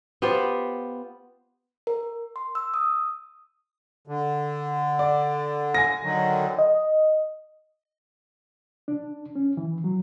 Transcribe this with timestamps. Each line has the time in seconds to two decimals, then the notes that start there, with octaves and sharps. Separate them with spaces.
0.22 B3 F4 G4 C5
1.87 A#4
2.36 C6
2.55 E6
2.74 D#6
4.07 D3
4.99 D5
5.74 G#5 A#6
6.03 D3 D#3 F#3
6.59 D#5
8.88 D4
9.36 C#4
9.57 E3
9.84 F#3